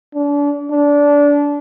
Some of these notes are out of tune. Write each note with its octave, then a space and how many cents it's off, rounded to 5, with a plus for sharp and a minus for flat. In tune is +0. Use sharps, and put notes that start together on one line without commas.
D4 -35
D4 -20